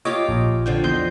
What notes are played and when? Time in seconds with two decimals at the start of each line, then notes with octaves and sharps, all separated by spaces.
0.05 F4 G4 A#4 C#5 D#5 D6
0.29 A#1
0.66 D3 F3 G5
0.84 E2 D#5 C6 G6